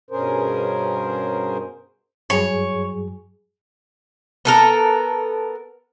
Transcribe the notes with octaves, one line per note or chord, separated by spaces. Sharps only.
G2 B2 C#4 G#4 A#4 C5
G2 F#3 G#4 C#5
B3 A4 A#4